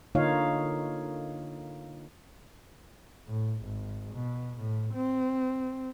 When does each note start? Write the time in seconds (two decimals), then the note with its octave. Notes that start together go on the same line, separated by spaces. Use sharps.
0.15 D3 A#3 D#4 F4 C#5 F5
3.27 A2
3.64 G#1
4.13 B2
4.60 A2
4.95 C4